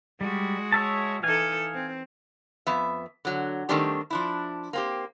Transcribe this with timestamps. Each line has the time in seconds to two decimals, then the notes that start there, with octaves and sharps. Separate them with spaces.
0.21 G3 G#3 F#4
0.72 C#5 E5 A5
1.23 E3 D#4 A4 F5 G#5
1.74 C4
2.67 F2 B3 E5
3.25 D3 F#3
3.69 D#3 G3 A3 C4 D4 G4
4.10 F3 D4 E4
4.73 A#3 C4 G4